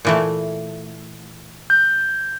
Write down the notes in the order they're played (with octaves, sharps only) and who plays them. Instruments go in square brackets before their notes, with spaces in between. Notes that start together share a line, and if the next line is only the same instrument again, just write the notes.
[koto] A#2 E3 A3
[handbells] G6